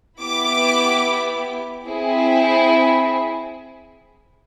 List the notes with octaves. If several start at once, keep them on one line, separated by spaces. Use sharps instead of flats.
B3 E4 G4 D6
C4 E4 G#4